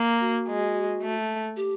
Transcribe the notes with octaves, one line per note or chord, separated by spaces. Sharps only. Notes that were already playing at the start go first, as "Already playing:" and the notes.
Already playing: A#3
F#4
G#3
A3
G4